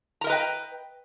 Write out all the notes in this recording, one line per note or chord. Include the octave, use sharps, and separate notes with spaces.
A#4 B4 D#5 G5 A#5